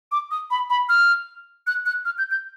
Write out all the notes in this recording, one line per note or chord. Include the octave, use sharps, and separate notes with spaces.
D6
D#6
B5
B5
F6
F#6
F#6
F6
G6
G6